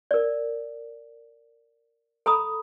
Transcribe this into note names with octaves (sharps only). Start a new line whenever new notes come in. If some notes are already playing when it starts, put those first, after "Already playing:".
A#4 D5
A4 A#5 B5 D#6